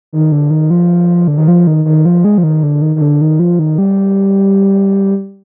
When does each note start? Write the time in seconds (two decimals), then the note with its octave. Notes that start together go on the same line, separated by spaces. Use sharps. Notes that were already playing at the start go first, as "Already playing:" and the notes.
0.13 D#3
0.32 D3
0.50 D#3
0.70 F3
1.28 D3
1.38 D#3
1.48 F3
1.67 D#3
1.85 D#3
2.05 F3
2.25 G#3
2.38 F3
2.43 D#3
2.63 D3
2.82 D#3
2.96 D#3
3.01 D3
3.21 D#3
3.39 F3
3.59 D#3
3.78 G3